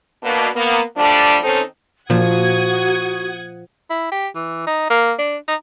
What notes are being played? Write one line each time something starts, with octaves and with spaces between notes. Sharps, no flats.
B2 A#3 D4
A#3 B3
F3 G3 A3 D4
D#3 C4 C#4 D#4 A4 C5
A#2 F3 F#4 F#5 D#6 G#6
E4
G4
E3
D#4
A#3
D4
D#4